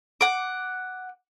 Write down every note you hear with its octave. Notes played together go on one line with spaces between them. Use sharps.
F#5 D6